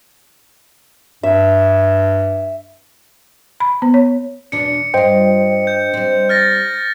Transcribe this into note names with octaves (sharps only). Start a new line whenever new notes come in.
G2 E5
B5
B3
C#5
E2 B2 D4 C#7
G2 F4 C5 D#5 G5
G6
G3 C4
F6 A6 A#6